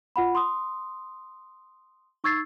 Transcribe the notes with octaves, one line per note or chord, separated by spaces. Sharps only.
F4 F#5 B5
C6 D#6
D#4 C#6 E6 G#6 A6 C7